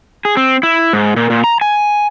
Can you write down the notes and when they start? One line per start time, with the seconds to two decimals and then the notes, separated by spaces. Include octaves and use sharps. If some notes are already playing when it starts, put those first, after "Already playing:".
0.25 G#4
0.37 C4
0.63 E4
0.93 G#2
1.16 A#2
1.30 A#2
1.44 A#5
1.61 G#5